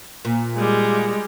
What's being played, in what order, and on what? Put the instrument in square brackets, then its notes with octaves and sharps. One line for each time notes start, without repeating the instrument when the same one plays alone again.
[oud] A#2
[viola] G3 G#3